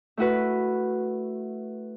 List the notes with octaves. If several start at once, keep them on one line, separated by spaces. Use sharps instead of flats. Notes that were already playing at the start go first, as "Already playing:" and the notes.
A3 E4 F#4 B4